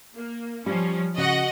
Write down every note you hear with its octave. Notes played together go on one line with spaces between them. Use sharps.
A#3
F3 G3 C#4
C#3 F#4 D#5 F#5